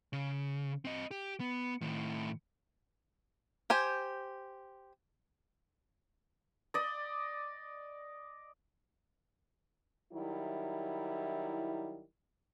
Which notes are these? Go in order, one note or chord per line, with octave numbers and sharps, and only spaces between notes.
C#3
C4 D#5
G4
B3
A2 D#3
G4 C5 G#5
D5 D#5
D#3 F#3 G3 E4